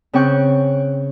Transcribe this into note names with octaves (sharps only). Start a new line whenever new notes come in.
C#3 C4 G5 C#6 F#6 G6